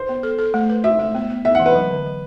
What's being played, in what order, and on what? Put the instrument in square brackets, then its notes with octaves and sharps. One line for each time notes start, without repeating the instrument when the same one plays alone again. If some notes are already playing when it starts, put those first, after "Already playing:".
Already playing: [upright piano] C5
[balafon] B3
A4
A4
A3
B4
[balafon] F#4 [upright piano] E5
[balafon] A3
B3
B3
[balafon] B3 [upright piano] E5
[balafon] E3 [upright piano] F#5
[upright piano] B4
[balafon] F#3
D3
F#3